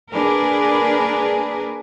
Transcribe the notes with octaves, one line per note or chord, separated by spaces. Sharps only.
A#3 D4 G#4 A#4 B4